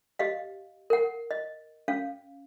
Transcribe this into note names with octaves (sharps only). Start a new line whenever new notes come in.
G4 D#5 F5
A#4 F#5
D#5
C#4 F5